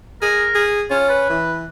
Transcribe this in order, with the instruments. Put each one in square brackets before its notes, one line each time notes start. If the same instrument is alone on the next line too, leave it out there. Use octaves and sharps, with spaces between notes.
[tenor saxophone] G#4 [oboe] A#4
[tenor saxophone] G#4
[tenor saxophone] C#4 [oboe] F4
[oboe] B4
[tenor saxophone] E3